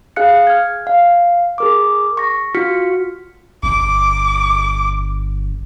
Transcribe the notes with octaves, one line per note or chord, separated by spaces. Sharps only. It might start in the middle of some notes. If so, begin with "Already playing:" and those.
G#4 F5 F#6 C#7
F6 G#6
F5
G#4 A#4 D6
C#6 A#6
F4 F#4 F6 B6 C#7
G1 D6